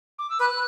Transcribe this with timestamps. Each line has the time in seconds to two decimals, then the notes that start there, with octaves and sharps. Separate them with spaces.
0.19 D6
0.30 E6
0.40 B4 F#6